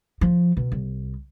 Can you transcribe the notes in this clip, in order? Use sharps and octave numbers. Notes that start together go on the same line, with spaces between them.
F3
B2
C2